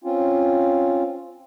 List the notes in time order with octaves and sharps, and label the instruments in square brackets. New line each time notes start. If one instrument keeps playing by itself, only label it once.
[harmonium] C4 C#4 F4